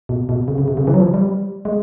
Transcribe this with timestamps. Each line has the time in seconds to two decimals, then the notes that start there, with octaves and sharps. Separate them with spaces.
0.09 B2
0.29 B2
0.48 C#3
0.58 C#3
0.68 C3
0.77 C#3
0.87 E3
0.94 F#3
1.00 F3
1.14 G3
1.65 G#3